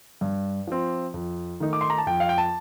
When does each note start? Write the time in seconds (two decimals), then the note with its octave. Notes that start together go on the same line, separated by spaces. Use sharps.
0.21 G2
0.68 F3 C4
1.14 F2
1.60 D#3 A3 D#4
1.73 D6
1.81 C6
1.90 A#5
1.98 A5
2.07 F2 G5
2.20 F5
2.29 G5
2.38 A5